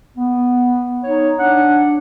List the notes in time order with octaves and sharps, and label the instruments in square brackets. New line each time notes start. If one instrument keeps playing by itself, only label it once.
[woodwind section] B3
D#4 C#5
D4 F#5